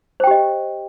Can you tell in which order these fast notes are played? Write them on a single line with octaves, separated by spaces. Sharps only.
C5 G5 G4 D#5